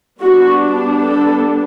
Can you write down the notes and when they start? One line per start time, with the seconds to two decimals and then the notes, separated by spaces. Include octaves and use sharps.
0.20 G3 B3 D4 F#4
1.05 A4